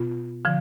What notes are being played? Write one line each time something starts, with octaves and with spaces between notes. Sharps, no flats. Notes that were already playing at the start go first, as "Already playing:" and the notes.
Already playing: B2 B3 F4
D3 F3